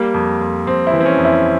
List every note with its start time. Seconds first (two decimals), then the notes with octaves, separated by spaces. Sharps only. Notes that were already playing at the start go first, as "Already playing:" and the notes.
Already playing: G3 A#3
0.14 F2
0.41 F2
0.66 F2 C4
0.87 E4
0.93 E3
1.00 C4
1.06 C#4
1.18 F2
1.25 E4